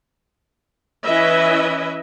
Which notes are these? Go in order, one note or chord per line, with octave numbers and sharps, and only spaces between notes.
E3 C#4 E4 B4 D#5 E5